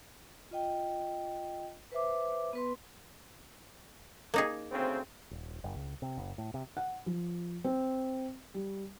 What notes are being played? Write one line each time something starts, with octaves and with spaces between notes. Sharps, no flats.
F4 D#5 G5
B4 C5 E5 D6
B3 B4 C6
A#3 D#4 G#4
D2 C#3 C4
D#1
F#1
C#2
C3
F#1
A2
C3
F#5
F3
C4
G3